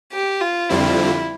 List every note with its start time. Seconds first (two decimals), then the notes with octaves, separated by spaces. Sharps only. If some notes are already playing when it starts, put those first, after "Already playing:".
0.12 G4
0.41 F4
0.69 F2 D3 G3 C4 E4 F4